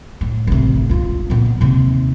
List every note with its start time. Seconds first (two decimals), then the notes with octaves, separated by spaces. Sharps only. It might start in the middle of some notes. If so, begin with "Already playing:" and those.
0.21 A2
0.47 A1 C3
0.89 E1 F4
1.30 A#2 B3
1.61 D#2 C3